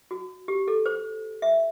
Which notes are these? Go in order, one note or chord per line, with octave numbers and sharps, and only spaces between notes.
F#4
G4
A4
C5
E5